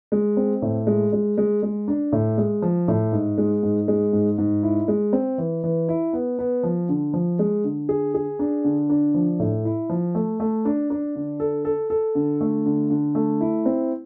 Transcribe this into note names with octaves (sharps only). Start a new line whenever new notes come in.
G#3
C4
A2
G#3
G#3
G#3
G#3
D4
A2
G#3
F3
A2
G#2
G#3
G#2
G#3
G#2
G#2
E4
G#3
C4
E3
E3
E4
B3
B3
F3
D3
F3
G#3
D3
G#4
G#4
D4
D3
D4
F3
A2
E4
F3
A3
A3
D4
D4
D3
A4
A4
A4
D3
A3
D3
D3
A3
E4
C4